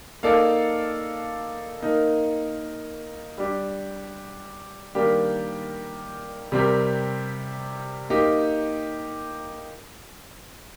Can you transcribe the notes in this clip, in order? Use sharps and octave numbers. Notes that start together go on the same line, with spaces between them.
A#3 D#4 A4 D5 F5
A#3 D#4 A#4
G3 D4 G4
D#3 G3 A#3 D4 G4
C3 G3 C4 G4 A#4
A#3 D#4 G4